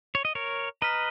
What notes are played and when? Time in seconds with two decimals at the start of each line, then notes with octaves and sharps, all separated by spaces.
0.15 C#5
0.25 D#5
0.35 A#4 C#5
0.82 B4 D#5 A#5 F6 B6